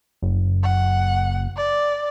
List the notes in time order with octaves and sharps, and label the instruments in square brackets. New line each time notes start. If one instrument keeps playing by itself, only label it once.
[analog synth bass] F#1
[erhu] F#5
D5